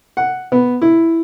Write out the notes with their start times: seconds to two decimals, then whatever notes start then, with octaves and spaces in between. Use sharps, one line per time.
0.17 F#5
0.52 B3
0.82 E4